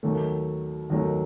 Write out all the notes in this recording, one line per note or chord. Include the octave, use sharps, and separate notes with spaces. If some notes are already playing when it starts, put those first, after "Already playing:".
D#2 D#3 F#3 A3
D#2 D#3 F#3 A3